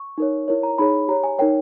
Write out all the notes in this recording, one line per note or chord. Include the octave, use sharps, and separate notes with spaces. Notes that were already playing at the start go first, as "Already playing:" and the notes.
Already playing: C#6
D#4 A#4 C#5
E4 A#4 C#5
A#5
D#4 G#4 C#5 B5
G4 C#5 A#5
G#5
D#4 A#4 C#5 G5